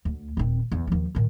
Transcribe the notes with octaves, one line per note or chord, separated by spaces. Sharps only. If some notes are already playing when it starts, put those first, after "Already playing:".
D2
D#1 C4
E2
D#2 F3
A2 D#3